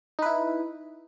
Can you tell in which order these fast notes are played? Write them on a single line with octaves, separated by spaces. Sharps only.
D#4 B4 E4